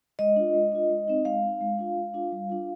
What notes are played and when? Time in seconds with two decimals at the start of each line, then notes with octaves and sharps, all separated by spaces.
0.19 G#3 D#5
0.36 D4 F4
0.54 G#3
0.72 D4 F4
0.90 G#3
1.08 C4 D#4
1.25 G#3 F5
1.43 C4 D#4
1.61 G#3
1.79 D4 F4
1.96 G#3
2.14 D4 F4
2.32 G3
2.49 D4 F4